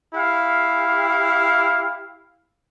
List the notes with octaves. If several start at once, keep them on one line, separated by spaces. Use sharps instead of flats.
E4 G4 F5